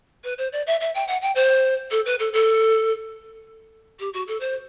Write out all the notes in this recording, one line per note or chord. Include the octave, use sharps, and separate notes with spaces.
B4
C5
D5
E5
E5
G5
F#5
G5
C5
A4
B4
A4
A4
G4
F#4
A4
C5